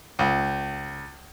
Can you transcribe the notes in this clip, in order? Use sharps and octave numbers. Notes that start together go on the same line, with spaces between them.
C#2